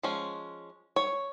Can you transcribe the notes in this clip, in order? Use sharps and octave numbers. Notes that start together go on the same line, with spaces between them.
F3 G#3 C#4
C#5